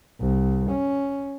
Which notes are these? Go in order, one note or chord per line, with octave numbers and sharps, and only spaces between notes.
C2
C#4